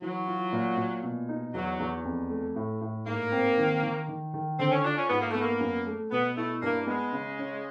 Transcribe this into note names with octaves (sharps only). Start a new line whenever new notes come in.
E3 F#3
F4
A#2
A#2
B2
D#4
E2 F#3
E2
F2
A3
A2
A2
G#2 A#3
C4
D#3
D#3
D#3
D#3
D3 C4
C#4
D4 F4
C#4
G#2 B3
A#3
A3 B3
A#3
F#2
A3
B2 B3
A3 E4
G2 A#3
G#3 B3
C#3
C#4